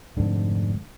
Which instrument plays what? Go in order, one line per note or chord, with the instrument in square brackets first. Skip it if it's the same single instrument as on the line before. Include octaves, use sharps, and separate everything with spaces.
[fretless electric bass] F1 G#2 D3 D4